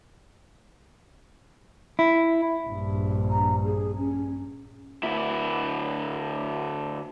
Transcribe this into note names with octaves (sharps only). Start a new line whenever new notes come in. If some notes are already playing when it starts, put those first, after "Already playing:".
E4
A#1 G2
A#5
G#4
C#4
D2 E4